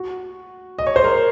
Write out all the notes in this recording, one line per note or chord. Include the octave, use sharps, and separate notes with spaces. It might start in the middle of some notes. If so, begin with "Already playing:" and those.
Already playing: F#4
D#5
C#5
C5
A#4